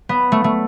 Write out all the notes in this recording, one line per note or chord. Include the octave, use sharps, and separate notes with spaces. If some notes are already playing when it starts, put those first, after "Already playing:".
B3
A3
A3